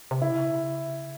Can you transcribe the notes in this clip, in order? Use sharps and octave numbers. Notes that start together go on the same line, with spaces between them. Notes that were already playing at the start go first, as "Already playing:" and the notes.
C3
C#3 E4